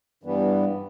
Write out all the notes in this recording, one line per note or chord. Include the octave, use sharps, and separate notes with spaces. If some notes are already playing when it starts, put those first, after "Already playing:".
G2 E3 G3 B3